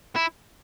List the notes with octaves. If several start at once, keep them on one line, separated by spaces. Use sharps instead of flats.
E4